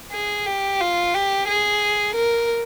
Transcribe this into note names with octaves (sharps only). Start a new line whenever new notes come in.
G#4
G4
F4
G4
G#4
A#4